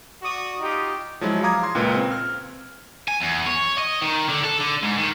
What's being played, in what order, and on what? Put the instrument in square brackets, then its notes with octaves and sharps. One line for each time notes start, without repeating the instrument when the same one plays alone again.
[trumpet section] F#4 D5 C#6 D#6
D#4 F4 G4
[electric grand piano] F3 F#3 G#3 E4
F5 A#5 D6 D#6 G#6
C6 G#6
C#2 A#2 A#4 B4
C4
F6
[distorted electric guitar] G#5
E2
C#5
D#5
D#3
D3
A4
D3
G#2
D#3